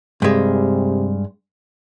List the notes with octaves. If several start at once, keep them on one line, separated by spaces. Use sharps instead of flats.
G2 C3 G#3